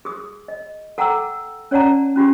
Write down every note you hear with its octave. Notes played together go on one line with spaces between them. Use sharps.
G#4 D#6
D#5
A4 F#5 G5 A#5 D6 E6
C#4 C#5 D5 F#5 A5 A#5
C#4 F4 G4 G#4